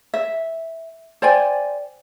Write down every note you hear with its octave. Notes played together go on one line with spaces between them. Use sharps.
E5
C5 D5 G5 G#5